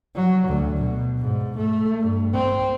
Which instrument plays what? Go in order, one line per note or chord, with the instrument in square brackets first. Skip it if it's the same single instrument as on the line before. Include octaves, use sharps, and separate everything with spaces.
[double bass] F#3
D2
B2
G#2
A3
G2
C4